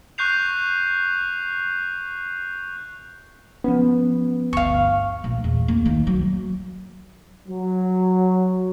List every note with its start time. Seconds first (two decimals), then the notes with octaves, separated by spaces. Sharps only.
0.18 C#6 F#6 G6 C7 F7
3.64 F3 B3 C#4
4.53 G1 D2 F5 C#6
5.24 A#1
5.44 E2
5.68 A#3
5.86 D#3
6.07 F#3
7.49 F#3